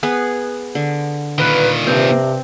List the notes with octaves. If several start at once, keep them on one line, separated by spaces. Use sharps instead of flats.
B3 G#4 B4
D3
A#2 D#3 B4
G2 C3 C4